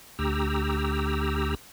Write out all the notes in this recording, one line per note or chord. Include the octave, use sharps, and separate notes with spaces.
D2 G4 A#5 E6